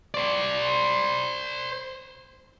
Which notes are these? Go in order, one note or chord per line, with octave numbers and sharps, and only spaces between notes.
C5 D5